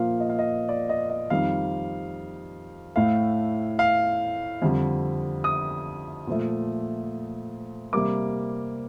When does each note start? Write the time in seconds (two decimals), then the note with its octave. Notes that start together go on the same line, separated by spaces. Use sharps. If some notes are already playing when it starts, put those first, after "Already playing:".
Already playing: A#2 F3 A#3 F5
0.20 D#5
0.29 F5
0.39 D#5
0.69 D5
0.89 D#5
1.10 D#5
1.30 F2 D#3 G3 F5
2.96 A2 A3 F5
3.79 F5
4.62 F2 D3 G3
5.44 D#6
6.27 A#2 F3 A3
7.93 C3 G3 A#3 D6